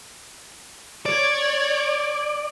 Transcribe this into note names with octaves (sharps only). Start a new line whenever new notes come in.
C#5 D5 G#6